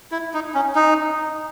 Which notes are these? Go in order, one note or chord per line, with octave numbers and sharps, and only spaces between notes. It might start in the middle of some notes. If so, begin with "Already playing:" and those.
E4
D#4
C#4
D#4